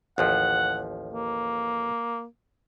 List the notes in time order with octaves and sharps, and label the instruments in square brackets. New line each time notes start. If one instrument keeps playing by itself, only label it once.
[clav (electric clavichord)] A1 D#2 F3 [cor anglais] F#5
[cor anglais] A#3